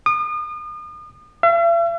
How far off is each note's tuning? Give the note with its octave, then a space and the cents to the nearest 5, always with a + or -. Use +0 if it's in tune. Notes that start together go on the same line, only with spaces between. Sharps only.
D#6 -40
E5 +45